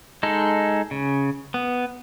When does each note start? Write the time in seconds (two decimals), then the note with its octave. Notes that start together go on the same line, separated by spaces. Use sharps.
0.23 G#3 D#4 A4
0.91 C#3
1.54 B3